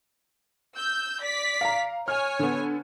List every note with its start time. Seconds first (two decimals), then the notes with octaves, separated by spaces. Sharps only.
0.76 E6 G6
1.22 D5 B6
1.61 F5 A#5
2.08 C#5 G#5 F6
2.39 D3 B3